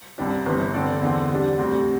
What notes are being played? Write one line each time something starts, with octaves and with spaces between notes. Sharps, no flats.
C2 C3 G3 D4 G4
G1 G2 E3 C4 G4
D3 C4 A4 D5
E2 D3 C4
C3 G3 D4
D2 C3 G3 C4